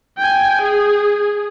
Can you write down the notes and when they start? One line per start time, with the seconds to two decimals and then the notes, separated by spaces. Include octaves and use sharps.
0.18 G5 G#5
0.61 G#4